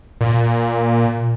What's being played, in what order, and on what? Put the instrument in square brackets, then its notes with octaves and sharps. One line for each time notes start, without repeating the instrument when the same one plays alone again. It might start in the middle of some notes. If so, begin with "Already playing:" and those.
[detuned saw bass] A#2